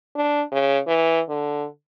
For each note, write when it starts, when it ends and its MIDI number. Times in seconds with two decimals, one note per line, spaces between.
0.15 0.43 62
0.52 0.79 49
0.87 1.21 52
1.29 1.67 50